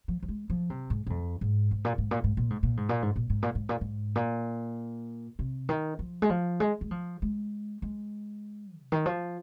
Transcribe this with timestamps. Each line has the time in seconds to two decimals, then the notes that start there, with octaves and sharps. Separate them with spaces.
0.08 F3
0.23 F3
0.28 G#3
0.50 F3
0.70 C3
0.90 G#2
1.07 G#2
1.10 F2
1.41 G#2
1.71 G#2
1.85 A#2
1.98 G#2
2.11 A#2
2.24 G#2
2.37 A#2
2.50 G#2
2.63 A#2
2.77 G#2
2.89 A#2
3.02 G#2
3.16 A#2
3.30 G#2
3.43 A#2
3.55 G#2
3.69 A#2
3.81 G#2
4.15 A#2
5.39 C3
5.69 D#3
5.99 F3
6.22 G#3
6.30 F3
6.60 G#3
6.81 G#3
6.91 F3
7.22 G#3
7.82 G#3
8.78 C3
8.92 D#3
9.06 F3